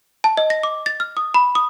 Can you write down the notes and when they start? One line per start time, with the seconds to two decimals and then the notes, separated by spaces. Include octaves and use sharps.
0.24 A5
0.37 D#5
0.50 A#6
0.63 D6
0.86 A6
1.00 F6
1.17 D#6
1.34 B5
1.55 D#6